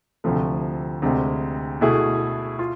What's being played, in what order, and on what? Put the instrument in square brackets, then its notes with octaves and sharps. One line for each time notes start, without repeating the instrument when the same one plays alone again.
[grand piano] D2 C3 F3 A3
D2 C3 G#3
B2 A3 E4 G#4
F4